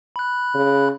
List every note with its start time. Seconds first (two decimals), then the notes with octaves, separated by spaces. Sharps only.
0.16 B5 F#6
0.55 C#3